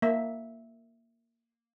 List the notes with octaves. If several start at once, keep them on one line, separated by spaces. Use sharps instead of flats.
A#3 E5